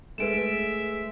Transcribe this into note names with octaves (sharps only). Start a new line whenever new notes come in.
G#3 A3 B4 E5 D7 E7